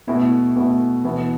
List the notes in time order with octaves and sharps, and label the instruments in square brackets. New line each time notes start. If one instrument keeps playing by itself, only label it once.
[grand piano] B2 A3 E4 [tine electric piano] B3
[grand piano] B2 A3 E4
[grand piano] B2 B3 E4 [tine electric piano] E3